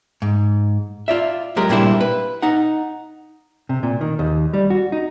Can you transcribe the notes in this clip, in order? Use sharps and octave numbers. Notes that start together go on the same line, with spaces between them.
G#2
F4 D5 E5
F#3 G#3 G4 A#4
A#2 G3 A#3 D4 E4 C5
B4
D#4 F#5
C3
A#2
D#3
D#2
G3
F#4
D#4